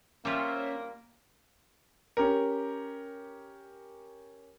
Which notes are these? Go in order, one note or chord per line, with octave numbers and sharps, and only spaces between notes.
G3 A#3 C#4 F4 C5 C#5 E5
C#4 G4 A#4